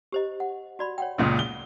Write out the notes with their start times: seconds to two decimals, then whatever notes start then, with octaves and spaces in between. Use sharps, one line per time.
0.12 G4 C5 D#5
0.40 F#5
0.79 F#4 D5 B5
0.98 C#5 F#5 G5
1.18 C#2 A#2 C#3
1.39 G7